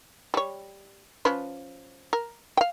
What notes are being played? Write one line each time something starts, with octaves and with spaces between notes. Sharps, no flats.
G3 C#5
F3 C#4 B4
A#4
F5 G5